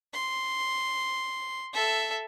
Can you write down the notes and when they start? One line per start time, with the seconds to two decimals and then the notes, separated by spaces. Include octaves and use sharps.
0.13 C6
1.73 A4 E5